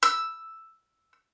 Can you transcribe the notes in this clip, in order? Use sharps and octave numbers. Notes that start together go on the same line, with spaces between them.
E6